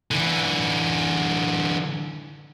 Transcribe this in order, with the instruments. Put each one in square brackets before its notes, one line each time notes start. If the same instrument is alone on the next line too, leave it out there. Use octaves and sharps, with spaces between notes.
[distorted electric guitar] D3 E3